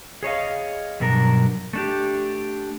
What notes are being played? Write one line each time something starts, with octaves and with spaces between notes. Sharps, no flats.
G#4 C#5 D#5 F5
G2 B2 F#3 D4 A#4
A3 D4 G4